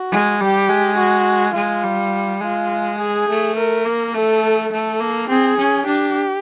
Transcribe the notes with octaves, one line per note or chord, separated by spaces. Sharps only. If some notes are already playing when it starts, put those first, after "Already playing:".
Already playing: F#4
G#3
G3 G4
G#3
F#4
G#3 F4
G3
G#3 F4
G#4
A3
A#4
A#3
A3 A4
A3 A4
A#3
C4 G#4
C#4
D4 G4